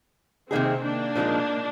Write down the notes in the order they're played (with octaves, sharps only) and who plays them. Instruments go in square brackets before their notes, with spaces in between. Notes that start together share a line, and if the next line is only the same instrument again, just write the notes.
[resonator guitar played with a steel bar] C3 D#3 A#3 D#4 G#4 [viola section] C4
[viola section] A#3 D4
[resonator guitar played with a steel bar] A#2 F3 G#3 D#4 A#4